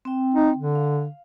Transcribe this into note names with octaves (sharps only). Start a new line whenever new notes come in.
C4 G5
D#4
D3
F5